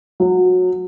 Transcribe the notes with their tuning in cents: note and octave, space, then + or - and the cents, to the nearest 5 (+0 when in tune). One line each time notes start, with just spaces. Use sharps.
F#3 -20